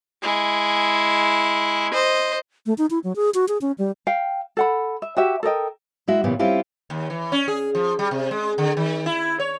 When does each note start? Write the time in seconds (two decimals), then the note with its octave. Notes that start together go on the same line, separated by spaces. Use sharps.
0.22 G#3 E4
1.93 C5 D#5
2.66 A3
2.78 D#4
2.90 E4
3.04 F#3
3.16 G#4
3.34 F#4
3.48 G#4
3.61 C#4
3.78 G3
4.07 F5 G5
4.57 A4 F#5 B5
5.02 E5
5.17 F#4 G4 E5
5.43 A4 A#4 D#5 G5
6.08 G#3 E4 F#4 E5
6.24 A#2 C#3 E3 B3 F4 G4
6.39 G3 C4 C#4 E4 F4 G4
6.90 D#2
7.10 E3
7.32 C#4
7.48 G#4
7.75 F3
7.99 G3
8.11 C3
8.31 G#3
8.58 D3
8.77 D#3
9.06 E4
9.40 C#5